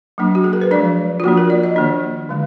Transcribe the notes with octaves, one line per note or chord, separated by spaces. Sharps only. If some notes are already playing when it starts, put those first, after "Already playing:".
F#3 A#3 D4
F#4
G#4
A#4
B4
F3 G#3 D4 D5
F4
F3 A#3 D4 F#4
A#4
D5
D#5
D#3 A#3 D4
D3 G#3